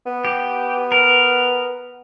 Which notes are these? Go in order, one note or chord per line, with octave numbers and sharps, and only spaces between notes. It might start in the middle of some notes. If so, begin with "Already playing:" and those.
B3
G4
A#4